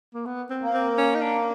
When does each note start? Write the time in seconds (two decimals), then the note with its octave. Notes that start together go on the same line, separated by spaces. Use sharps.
0.15 A#3
0.26 B3
0.50 C4
0.62 A#3
0.74 C4
0.98 C#4
1.15 D#4
1.22 D4